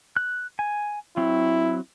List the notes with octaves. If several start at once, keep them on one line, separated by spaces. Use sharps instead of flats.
F#6
G#5
F#3 C4 E4